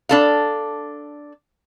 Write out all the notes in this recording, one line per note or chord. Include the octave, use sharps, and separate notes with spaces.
D4 A4 F5